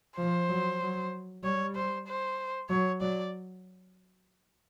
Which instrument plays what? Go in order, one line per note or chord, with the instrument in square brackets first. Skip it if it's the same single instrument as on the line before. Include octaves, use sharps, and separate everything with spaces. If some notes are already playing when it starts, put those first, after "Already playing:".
[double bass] F3 [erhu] C5
[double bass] F#3
F#3
[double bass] G3 [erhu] C#5
[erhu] C5
C5
[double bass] F#3 [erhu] C#5
[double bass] F#3 [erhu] D5